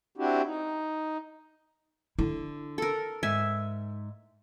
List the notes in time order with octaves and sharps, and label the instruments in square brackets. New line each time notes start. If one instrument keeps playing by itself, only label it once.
[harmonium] C4 D4 E4 F#4 G4
D#4
[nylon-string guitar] D3 [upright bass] E4
[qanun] A4 A#4
[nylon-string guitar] G#2 [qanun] E5 G#5